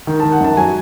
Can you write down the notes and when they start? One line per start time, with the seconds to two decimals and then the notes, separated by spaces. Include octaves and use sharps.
0.07 D#3
0.20 D#3 A5
0.32 F#5
0.40 F#2 A5
0.57 F#3 G#5